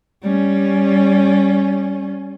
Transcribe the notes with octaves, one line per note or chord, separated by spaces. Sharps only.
G3 C#4